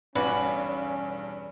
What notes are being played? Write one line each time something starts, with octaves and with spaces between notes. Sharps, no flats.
B1 E2 G2 C#4 F#4 B4 D5 G#5